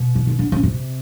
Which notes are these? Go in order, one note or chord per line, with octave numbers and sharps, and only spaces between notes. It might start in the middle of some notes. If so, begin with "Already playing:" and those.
Already playing: B2
E3
D#3
D3
C#3
C3